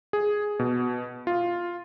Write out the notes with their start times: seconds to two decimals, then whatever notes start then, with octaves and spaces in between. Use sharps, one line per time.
0.13 G#4
0.59 B2
1.27 F4